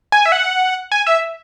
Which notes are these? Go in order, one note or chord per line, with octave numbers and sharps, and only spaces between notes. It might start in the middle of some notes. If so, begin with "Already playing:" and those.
G#5
E5
F#5
G#5
E5